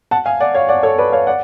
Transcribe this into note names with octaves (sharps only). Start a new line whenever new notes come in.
F#5 A5
F5 G#5
D5 F#5
C#5 F5
D5 F#5
A4 C#5
B4 D5
C#5 F5
D5 F#5